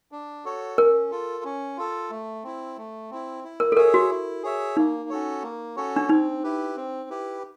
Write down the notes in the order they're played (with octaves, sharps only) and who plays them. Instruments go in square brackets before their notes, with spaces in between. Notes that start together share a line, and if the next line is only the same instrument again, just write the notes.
[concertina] D4
F#4 A4 C#5
[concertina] C#4 [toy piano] A#4
[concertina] F4 A4
C#4
F4 A4
A3
C4 E4
A3
C4 E4
E4
[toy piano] A#4
A4
[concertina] G#4 C#5 E5 [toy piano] A#4
[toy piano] F#4
[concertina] E4
G#4 C#5 E5
[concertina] A#3 [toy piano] D#4
[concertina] C#4 F#4 A4 C#5
A#3
C#4 F#4 A4 C#5
[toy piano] D4
[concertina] C4 [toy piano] D#4
[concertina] E4 G4 B4
C4
E4 G4 B4